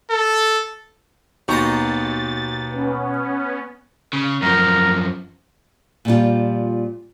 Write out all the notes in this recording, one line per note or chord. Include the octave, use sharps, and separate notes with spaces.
A4
D#2 B2 D#4 A#5 C6 C#6 A6
B3 C#4
C#3
F#2 F3 A#4
A#2 F3 G3 F4